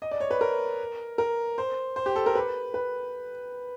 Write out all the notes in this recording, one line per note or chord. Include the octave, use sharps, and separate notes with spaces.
D#5
D5
C#5
B4
A#4
A#4
C5
C5
G4
A4
A#4
B4
B4